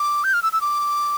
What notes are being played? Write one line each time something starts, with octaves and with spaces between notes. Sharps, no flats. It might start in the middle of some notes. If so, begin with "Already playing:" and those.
Already playing: D6
G6
F6
E6
E6
D6